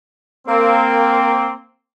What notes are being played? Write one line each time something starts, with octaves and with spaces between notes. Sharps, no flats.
A#3 C4